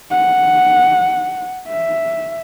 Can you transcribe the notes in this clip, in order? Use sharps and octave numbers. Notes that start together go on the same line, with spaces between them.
F#5
E5